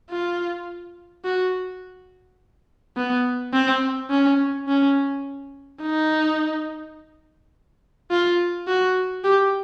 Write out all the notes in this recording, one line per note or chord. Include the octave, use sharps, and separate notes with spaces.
F4
F#4
B3
C4
C#4
C#4
D#4
F4
F#4
G4